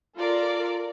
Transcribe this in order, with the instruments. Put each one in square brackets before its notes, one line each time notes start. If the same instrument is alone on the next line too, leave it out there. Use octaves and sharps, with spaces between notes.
[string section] F4 A4 A#4 D5